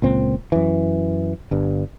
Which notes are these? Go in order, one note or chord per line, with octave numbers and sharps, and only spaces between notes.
C#2 A#2 C4
F#2 E3
G1 G2